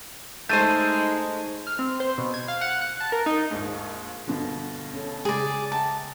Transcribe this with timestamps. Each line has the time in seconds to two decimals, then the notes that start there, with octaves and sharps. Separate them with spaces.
0.49 G#3 A3 D#4 C5 G6 D#7
1.67 F6
1.79 C4
2.00 C5
2.18 B2
2.34 G#6
2.48 F5
2.61 F#5
2.81 F#6
3.00 A5
3.12 A#4
3.26 D#4
3.51 A#1 D#2 G#2
4.28 G2 B2 D3 F3
4.93 C#4 A4
5.25 C#3 G#3 G#4 D5
5.72 E5 G5 A5 A#5